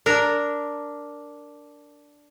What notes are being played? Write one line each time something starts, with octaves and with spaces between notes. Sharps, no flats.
D4 A#4